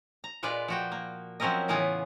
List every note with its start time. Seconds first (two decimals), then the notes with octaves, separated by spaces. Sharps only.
0.24 A#5
0.43 A#2 G#3 F4 B4 D5
0.68 F3 F#4 G5
0.92 A#3
1.40 F3 F#3 C4 C#4 A#4 D#5
1.68 A2 C#3 E3 B3 F4 G#4